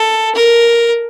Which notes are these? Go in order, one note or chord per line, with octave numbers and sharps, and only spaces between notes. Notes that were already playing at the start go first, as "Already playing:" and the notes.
Already playing: A4
A#4